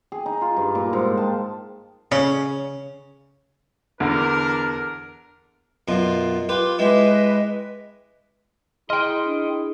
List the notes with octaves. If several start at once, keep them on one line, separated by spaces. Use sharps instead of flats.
G#4
D#4
F4
G2
A#2
G#2
A5
C#3 C#4
E2 D3 D4 A#4
F#2 B2 F4
F4 G4 B4
G#3 E4 G4 B4 D#5
E4 G#4 D#5 G5 C6 F6
D4